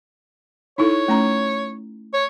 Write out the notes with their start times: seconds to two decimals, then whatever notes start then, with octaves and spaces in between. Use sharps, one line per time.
0.78 D#4 E4 A4 C#5
1.08 A3 C#4 A#5
2.13 C#5